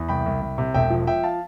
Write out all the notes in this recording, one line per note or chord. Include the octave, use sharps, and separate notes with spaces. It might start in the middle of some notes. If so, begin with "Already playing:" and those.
Already playing: E2
C2 G5 B5
C2
C2
C3
E1 E5 G5
F3
F3 E5 G5
F5 A5